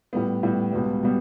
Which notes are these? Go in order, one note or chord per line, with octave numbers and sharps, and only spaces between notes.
A2 G3 B3
A2 G3 B3
C#2 B2 G3 B3
B2 G3 B3